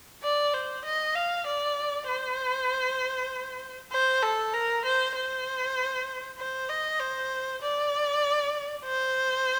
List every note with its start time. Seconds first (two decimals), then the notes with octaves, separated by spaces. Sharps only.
0.23 D5
0.54 C5
0.85 D#5
1.15 F5
1.47 D5
2.08 C5
3.92 C5
4.23 A4
4.54 A#4
4.85 C5
5.16 C5
6.39 C5
6.69 D#5
7.00 C5
7.62 D5
8.85 C5